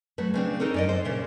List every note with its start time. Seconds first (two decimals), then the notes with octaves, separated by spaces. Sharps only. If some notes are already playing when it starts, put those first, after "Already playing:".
0.18 F#3 A3 C4 B4
0.34 C#3 C4 D4
0.60 D#4 A4 A#4 C#5
0.74 F#2 D5 D#5
0.89 C5
1.05 A#2 C#3 E5